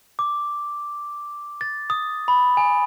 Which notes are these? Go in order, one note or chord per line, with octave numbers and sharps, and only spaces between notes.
D6
A6
D#6
B5
G#5